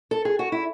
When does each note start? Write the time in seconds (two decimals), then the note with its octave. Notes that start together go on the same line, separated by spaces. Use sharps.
0.11 A4
0.25 G#4
0.39 F#4
0.52 E4